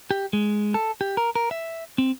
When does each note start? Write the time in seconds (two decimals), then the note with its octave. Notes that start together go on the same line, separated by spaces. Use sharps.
0.11 G4
0.33 G#3
0.74 A4
1.01 G4
1.17 A#4
1.35 A#4
1.51 E5
1.98 C4